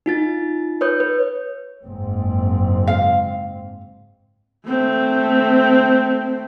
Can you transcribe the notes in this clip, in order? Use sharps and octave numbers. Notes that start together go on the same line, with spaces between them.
D#4 F4 A6
B4 C#5 D#6 G6
B4
F#1 G#2 C4
F5
A3 C4